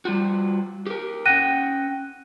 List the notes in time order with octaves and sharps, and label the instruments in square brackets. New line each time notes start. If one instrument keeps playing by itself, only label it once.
[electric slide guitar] G3 F4 F#4
G4 A#4
[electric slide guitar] C#4 F#5 G5 [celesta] F#6 A#6 D#7